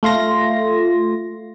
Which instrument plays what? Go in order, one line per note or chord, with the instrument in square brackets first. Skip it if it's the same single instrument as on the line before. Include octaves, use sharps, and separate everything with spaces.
[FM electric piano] A3 F4 C6 A#6